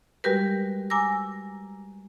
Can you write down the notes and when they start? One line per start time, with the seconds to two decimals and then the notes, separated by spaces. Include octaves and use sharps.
0.24 G3 G#3 F#4 G4 A#4 B4
0.90 G#5 A#5 D6 E6 A#6